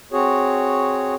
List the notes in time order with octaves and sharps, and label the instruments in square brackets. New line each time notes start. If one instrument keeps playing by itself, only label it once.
[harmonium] C4 F#4 G#4 C#5